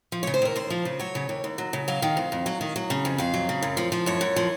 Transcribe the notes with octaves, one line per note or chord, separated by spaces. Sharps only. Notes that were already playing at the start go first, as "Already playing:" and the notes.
F3
C#3 C#5
C5
D#2 A#4
D#2 C5
F3
C#3
F#3 C#5
C#3
D#2
D#2
F#3
C#3
F#3 F5
D#3
F2
F2
F#3
D#3
F#3
C#3
F2
F2 F5
F#3
C#3
F#2
F3
F3
F#2 C#5
F#2
F3